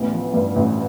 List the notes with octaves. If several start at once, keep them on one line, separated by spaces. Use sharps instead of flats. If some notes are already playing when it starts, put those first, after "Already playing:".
Already playing: A1 D2 B3
F3
G2
A1